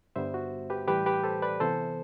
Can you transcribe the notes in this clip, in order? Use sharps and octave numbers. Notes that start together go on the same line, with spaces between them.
G2 D3 G3 B3 C5 E5
F#4
G4 B4
A2 E3 G3 G4 B4
G4 B4
A4 C5
B4 D5
C3 E3 B3 A4 C5